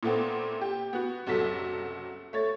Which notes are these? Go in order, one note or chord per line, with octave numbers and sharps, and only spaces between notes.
A#2 A3 B3 C4
G4
B3 F#4
F#1 C2 F#3 A4 B6
A3 C#5 A6